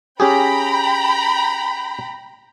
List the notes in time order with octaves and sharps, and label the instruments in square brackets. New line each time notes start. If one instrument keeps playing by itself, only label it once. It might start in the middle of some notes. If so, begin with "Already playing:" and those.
[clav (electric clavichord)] C#4 G4 G#4 [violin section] G5 A#5 B5